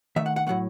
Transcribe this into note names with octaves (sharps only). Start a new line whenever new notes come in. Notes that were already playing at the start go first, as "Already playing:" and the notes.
D#3 A3 E5
F#5
F#5
A2 F#3 A3 F#5